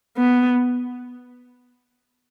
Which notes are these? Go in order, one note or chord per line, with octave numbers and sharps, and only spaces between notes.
B3